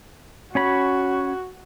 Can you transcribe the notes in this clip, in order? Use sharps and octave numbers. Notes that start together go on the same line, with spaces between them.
C#4 F#4 C#5 B5